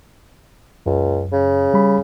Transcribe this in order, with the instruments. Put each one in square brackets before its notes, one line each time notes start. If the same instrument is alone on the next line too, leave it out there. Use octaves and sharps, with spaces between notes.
[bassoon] C#2 [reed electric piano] F#2
[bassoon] C#3
[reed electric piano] G3 B5